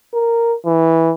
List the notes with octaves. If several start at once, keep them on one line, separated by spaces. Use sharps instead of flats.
A#4
E3